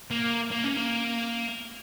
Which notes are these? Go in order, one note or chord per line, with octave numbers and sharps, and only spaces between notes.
A#3
A#3
C#4
A#3